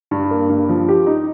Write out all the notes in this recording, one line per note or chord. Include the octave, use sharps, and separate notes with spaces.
G2
A#3
G2
F3
G4
D#4